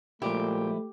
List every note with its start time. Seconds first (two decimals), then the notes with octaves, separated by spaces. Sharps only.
0.22 A#2 F3 G#3 A3 E4 G4